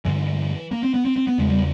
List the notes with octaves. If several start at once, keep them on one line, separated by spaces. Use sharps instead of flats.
G2 D3 E3
A#3
C4
B3
C4
C4
B3
E2 C#3 G#3
G3